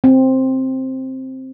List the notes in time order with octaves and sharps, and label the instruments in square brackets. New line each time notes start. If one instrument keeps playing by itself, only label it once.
[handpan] C4